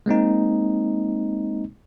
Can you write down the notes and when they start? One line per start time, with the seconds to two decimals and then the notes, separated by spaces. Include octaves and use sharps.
0.06 G#3 A#3 C4 D#4